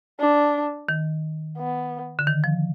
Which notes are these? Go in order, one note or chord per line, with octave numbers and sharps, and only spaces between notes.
D4
D#3
B3
D3
D#3
F3